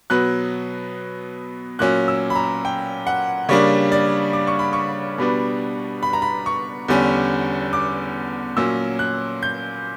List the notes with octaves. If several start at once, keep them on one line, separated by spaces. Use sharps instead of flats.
B2 F#3 B3 F#6
A#2 F#3 C#4 F#6
E6
B5
A#5
G5
F#5
C#3 G3 A#3 D4 C#5
D5
D6
C#6
B5
C#6
B2 G3 B3 D4
B5
A#5
B5
C#6
E2 D3 G3 C#4
D6
A#2 F#3 C#4 E6
F#6
G6